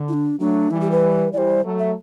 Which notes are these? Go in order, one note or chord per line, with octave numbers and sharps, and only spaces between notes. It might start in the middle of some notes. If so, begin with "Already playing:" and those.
Already playing: D3
E4
D4
F#3 A3 D4
E3 G3 E4
G4
B4
E3 G3 C5 D5
F#3 A3
E5